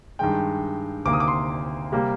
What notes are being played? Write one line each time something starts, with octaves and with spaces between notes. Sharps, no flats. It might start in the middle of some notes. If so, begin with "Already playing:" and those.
G2 D#3 G#3 G5
D2 C3 D#3 A#3 D6
D#6
D6
C6
C3 G3 A#3